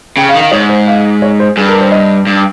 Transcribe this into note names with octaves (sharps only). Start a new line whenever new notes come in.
C#3 G5
F5
D#3
F5
G#2 C#5
C5
F5
C#5
C5
G2 G#4
A#4
C5
D#5
G2